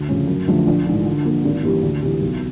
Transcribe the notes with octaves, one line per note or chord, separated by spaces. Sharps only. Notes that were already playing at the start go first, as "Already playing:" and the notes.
Already playing: D2
C#3 F3 A3 C#4
F#2
D3 F3 A3
A#1
G#2 E3
D3
F3 A#3
G#1
G2 E3 G3 A#3
D2
C3 E3
B1